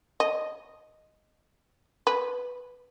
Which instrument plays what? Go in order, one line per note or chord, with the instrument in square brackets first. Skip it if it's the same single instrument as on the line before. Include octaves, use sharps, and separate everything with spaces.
[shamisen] D#5
B4